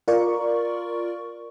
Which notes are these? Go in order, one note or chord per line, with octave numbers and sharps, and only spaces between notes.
F4 A#4 D5 C#6